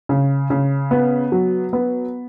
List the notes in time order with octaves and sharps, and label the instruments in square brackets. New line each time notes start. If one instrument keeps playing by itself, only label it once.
[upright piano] C#3
C#3
B3
F#3
B3